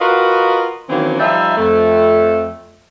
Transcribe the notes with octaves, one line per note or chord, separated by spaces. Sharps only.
F4 F#4 A#4 B4 D#5 F5
D#3 E3 F#3 A#3 C4 C#4
F3 G3 D#4 F4 E5
F2 A3